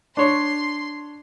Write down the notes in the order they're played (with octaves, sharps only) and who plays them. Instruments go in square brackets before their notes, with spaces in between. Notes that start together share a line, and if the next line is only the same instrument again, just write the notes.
[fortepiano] D4 C#5 [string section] C6